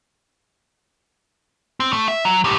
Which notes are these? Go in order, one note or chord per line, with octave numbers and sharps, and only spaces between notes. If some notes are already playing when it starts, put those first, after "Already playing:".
C4
A3
E5
F#3
A2 G4